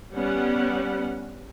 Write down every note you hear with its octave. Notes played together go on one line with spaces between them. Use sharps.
G3 B3 C#4 F#5